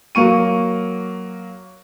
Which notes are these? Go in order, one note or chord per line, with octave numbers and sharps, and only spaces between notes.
F#3 A#3 C#6 D#7